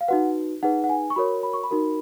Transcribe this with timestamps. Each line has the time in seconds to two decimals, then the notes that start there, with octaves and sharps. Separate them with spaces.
0.01 F5
0.08 D#4 F#4 B4 F#5
0.63 D#4 G#4 B4 F#5
0.84 F#5
0.89 G#5
1.10 C#6
1.16 F#4 A#4 C#5 B5
1.43 B5
1.53 C#6
1.64 B5
1.71 D#4 F#4 A#4